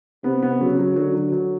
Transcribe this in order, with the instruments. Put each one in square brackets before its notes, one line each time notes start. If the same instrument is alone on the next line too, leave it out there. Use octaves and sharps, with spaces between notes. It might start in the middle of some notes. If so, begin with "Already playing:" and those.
[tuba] C3 [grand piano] B3
[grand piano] B3
[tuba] C#3 [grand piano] F#3
[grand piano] F#3
[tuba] D3 [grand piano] F#3
[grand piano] F#3
F#3